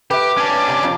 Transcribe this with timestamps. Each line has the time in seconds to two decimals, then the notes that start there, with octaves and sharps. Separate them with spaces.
0.11 G4 B4 E5 D6
0.37 C#4 D4
0.55 D6
0.69 C3
0.83 F2 C3 F4